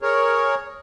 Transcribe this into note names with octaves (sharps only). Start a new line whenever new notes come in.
G#4 A#4 C#5